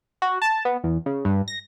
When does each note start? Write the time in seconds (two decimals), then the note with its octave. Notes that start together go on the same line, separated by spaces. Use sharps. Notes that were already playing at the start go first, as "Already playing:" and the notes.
0.22 F#4
0.42 A5
0.65 B3
0.84 E2
1.06 C#3
1.25 G2
1.48 A#6